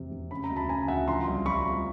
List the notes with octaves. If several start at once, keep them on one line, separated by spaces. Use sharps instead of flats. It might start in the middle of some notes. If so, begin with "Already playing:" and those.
Already playing: F1 E2 C3
F1
C#3 B5
A#5
D2
A5 B5
C#3 G#5 A#5
D2 E5 F#5
F3 A#5 C6
C2
F3 B5 C#6
C2